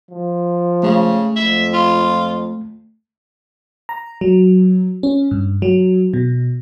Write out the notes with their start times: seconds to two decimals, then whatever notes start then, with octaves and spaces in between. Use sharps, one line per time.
0.11 F3
0.83 C#3 A3
1.36 F2 E5
1.73 F4
3.89 A#5
4.21 F#3
5.03 C#4
5.31 G2
5.62 F#3
6.14 B2